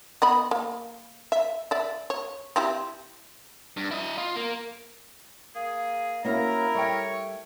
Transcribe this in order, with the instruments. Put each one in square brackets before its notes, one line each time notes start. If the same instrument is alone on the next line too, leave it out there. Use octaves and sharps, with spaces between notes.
[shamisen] B3 D#5 B5
A#3
E5
D5 E5
C#5
C4 E4 G4
[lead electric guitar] G2
E4 D#5
F4
A#3
[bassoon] A#3 [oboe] G#4
[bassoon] F#3 [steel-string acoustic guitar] A#3 C#4 F5 [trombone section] E4 A#4 [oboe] A#5
[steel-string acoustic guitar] G3 G5 [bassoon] A3 [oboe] C#5